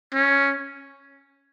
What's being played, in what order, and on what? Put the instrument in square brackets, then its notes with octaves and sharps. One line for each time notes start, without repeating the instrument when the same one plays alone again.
[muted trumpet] C#4